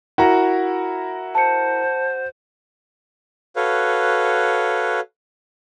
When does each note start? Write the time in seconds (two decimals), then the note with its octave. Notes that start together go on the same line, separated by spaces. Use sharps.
0.18 E4 F#4 A#4 A#5
1.35 C5 A5 C#7
3.56 F#4 A4 B4 C#5 F5